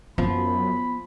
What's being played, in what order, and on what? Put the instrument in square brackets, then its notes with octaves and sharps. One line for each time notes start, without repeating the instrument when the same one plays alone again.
[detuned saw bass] F#2 [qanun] F3 [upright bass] B3 [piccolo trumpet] B5